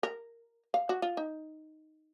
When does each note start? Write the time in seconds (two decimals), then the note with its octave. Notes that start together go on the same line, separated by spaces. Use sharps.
0.03 A#4
0.74 F5
0.89 F#4
1.02 F4
1.17 D#4